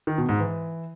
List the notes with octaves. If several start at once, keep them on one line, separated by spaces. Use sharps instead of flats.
D#3
B2
G#2
E3